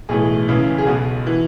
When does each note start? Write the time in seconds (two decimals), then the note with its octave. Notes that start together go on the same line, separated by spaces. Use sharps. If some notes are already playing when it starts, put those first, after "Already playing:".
0.09 B1 A2 E3 G#4
0.48 C#2 C#3 E3
0.78 G#4
0.87 B1 B2 F#4
1.27 E3